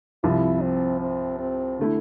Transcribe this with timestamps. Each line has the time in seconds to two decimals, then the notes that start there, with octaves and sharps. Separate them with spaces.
0.24 C2 C3 F3 E4
0.62 C4
1.01 C4
1.39 C4
1.79 D3 A3 E4